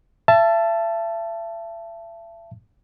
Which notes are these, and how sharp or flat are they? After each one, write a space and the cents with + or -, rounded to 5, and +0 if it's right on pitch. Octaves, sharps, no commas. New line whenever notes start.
E5 +35 A5 +0